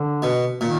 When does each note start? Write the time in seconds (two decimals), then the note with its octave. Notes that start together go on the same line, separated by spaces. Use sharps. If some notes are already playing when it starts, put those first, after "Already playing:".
Already playing: D3
0.22 B2
0.61 A#2 D#3